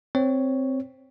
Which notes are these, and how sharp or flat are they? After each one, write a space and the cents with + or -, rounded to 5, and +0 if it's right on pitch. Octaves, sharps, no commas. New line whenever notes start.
C4 +0 C#5 +5